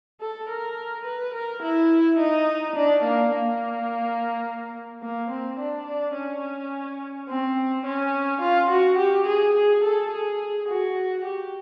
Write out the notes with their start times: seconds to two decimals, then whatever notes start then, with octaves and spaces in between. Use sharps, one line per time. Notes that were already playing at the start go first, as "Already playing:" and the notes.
0.21 A4
0.49 A#4
1.05 B4
1.34 A#4
1.62 E4
2.19 D#4
2.76 D4
3.04 A#3
3.32 A#3
5.02 A#3
5.30 C4
5.59 D4
5.86 D4
6.15 C#4
7.29 C4
7.85 C#4
8.41 F4
8.70 F#4
8.98 G4
9.26 G#4
9.55 G#4
9.84 A4
10.11 G#4
10.68 F#4
11.25 G4